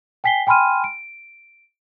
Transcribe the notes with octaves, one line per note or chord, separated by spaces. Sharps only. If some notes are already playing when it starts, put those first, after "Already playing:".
G5 G#5 B6 C7 G7
G5 G#5 B5 C6 F6 D#7
D7